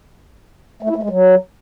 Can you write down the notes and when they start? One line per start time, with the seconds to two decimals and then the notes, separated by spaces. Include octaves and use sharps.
0.83 A3
0.89 E4
0.96 A3
1.03 G#3
1.10 F#3